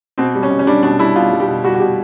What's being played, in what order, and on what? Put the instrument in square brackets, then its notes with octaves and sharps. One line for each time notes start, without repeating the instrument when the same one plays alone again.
[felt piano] B2 C4
G3
C#4
B2
C#4
G3 D4
B2 D4
G3 E4
B2 F4
G3
G4
B2
G3 F#4
F#4
B2 G4